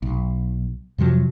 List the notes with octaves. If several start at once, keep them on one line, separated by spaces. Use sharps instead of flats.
B1
F2 C3 F3 F#3